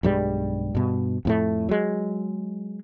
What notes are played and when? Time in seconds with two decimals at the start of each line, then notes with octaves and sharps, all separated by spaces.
0.03 B1 G2 G3 G#3
0.75 G2 B2
1.25 F2 A2 A3
1.69 F#3 G#3